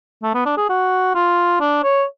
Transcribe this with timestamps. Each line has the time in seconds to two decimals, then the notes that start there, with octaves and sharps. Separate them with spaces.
0.23 A3
0.34 B3
0.46 D4
0.57 G#4
0.69 F#4
1.15 F4
1.60 D4
1.84 C#5